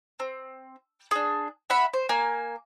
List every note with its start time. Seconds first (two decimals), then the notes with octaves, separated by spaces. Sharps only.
0.20 C4
1.11 D4 G#4
1.70 E5 F#5 B5
1.94 C5
2.09 A#3 G#5